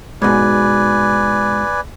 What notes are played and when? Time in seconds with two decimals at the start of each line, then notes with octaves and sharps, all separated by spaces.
0.22 G#2 B2 B4 D5 G#5